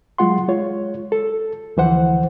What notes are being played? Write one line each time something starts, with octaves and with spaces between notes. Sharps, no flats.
F#3 G#3 F4 F#5 C6
G#3 F4 C#5
A4
D2 D3 E3 F3 C5 F#5